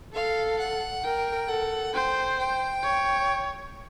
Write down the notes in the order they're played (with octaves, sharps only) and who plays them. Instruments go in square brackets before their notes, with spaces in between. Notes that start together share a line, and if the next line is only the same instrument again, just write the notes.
[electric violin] A4 [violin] F5
[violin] F#5
[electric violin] A#4 [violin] G5
[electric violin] A4 [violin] F#5
[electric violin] C5 [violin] G5
[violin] G5
[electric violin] C#5